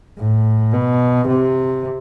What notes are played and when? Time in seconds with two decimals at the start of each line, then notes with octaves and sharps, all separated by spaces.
0.18 A2
0.73 B2
1.28 C3